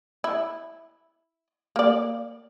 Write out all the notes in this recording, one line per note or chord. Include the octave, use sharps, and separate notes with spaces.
E4
A#3 D5